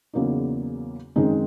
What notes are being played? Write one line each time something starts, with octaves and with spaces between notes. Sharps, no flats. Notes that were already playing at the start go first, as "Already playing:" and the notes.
E2 C#3 F#3 A#3 D#4
F#2 D#3 G#3 C4 D#4